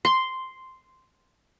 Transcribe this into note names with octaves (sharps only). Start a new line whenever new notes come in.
C6